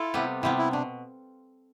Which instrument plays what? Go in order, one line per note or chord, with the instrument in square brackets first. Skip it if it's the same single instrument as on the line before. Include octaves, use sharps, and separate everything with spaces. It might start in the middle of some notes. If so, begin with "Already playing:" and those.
Already playing: [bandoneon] E4 [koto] F4 A4
[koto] C3 G3 B3
[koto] C3 G3 B3 [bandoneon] E4
[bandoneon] E4
[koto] B2 [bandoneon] D4